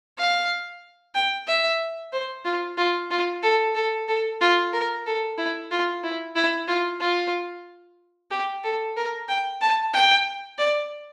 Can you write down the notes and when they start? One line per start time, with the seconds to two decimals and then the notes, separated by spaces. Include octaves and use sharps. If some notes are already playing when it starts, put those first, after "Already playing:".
0.18 F5
1.15 G5
1.48 E5
2.13 C5
2.45 F4
2.78 F4
3.11 F4
3.43 A4
3.75 A4
4.08 A4
4.41 F4
4.73 A#4
5.06 A4
5.38 E4
5.71 F4
6.04 E4
6.36 E4
6.68 F4
7.00 F4
8.31 G4
8.64 A4
8.97 A#4
9.29 G5
9.61 A5
9.93 G5
10.59 D5